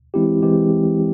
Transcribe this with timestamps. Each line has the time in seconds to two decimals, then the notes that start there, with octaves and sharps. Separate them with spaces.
0.14 E3 G#3 C4 E4 G4
0.42 E3 G#3 C4 E4 G4